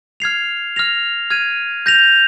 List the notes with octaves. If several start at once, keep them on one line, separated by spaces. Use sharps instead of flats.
F6 G#6 C7 F7
F6 A#6 F7
F6 G#6 D#7
G6 A#6 F7